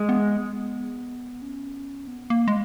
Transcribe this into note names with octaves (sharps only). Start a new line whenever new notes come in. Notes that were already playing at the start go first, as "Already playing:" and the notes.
Already playing: G#3
B3
C#4
B3
A#3
G#3